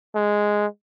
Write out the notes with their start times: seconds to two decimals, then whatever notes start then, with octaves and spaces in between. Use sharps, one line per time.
0.15 G#3